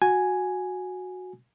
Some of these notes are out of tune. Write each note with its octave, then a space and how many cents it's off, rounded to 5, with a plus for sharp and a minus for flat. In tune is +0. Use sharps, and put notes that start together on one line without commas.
F#4 -10 G#5 +0